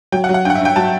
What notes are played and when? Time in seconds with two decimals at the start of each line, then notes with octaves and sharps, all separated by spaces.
0.12 F#3 G5
0.24 F#5
0.29 F#3
0.34 F#5
0.45 G2 G5
0.50 F#5
0.56 E5
0.61 G2 G5
0.76 F#3 A5